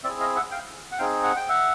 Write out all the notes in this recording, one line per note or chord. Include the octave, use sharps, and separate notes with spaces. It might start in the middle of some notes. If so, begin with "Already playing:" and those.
C4 E4 G#4 D5 E5
D#5 F5
E5 F#5
F5 G5
F#5
C4 D#4 G#4 F5 G5
F#5
G5
E5 F#5